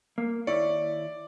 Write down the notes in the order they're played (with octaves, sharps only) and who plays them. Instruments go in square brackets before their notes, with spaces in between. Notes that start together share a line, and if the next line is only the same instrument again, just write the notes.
[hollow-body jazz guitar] A#3
[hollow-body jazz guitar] D#2 E4 C#5 [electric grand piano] D5